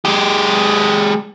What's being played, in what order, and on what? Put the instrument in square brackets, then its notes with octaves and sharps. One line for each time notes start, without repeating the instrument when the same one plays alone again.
[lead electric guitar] G#3 G4